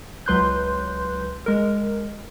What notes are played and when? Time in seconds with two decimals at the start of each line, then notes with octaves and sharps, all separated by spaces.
0.26 C#2 F#3 B4 C6 F#6 G6
1.46 G#3 A#4